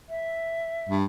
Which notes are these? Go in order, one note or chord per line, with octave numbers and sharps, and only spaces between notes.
E5
G2